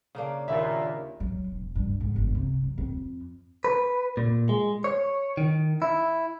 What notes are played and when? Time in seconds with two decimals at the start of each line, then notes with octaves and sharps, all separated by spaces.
0.15 C#3 A#3 D4
0.48 D#2 A#2 E4 E5
1.20 F#3
1.51 E1
1.75 G2
2.01 G#2
2.16 G1
2.35 C3
2.63 F#3
2.78 F2
3.65 B4
4.17 A#2
4.49 G#3
4.84 C#5
5.37 D#3
5.82 E4